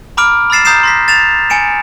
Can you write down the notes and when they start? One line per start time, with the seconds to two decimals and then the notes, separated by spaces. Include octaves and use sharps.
0.17 A#5 B5 D6 F6 D7
0.50 B5 E6 F6 A6 C7 E7
0.65 A#5 D#6 G6 A6 C7 E7
0.83 C6 A#6 B6
1.08 A6 E7 F7
1.50 G#5 C#7 D7 E7